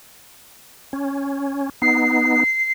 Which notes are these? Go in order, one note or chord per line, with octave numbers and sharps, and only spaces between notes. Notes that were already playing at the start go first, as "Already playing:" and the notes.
C#4
B3 D#4 C7